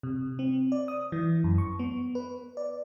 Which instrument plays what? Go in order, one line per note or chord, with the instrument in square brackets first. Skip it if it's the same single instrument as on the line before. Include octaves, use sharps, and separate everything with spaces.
[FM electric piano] C3
C4
D5
D#6
E3
F#2
C#6
B3
B4
D5